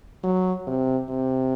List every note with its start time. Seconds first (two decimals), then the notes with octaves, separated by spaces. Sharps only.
0.23 F#3
0.67 C3
1.09 C3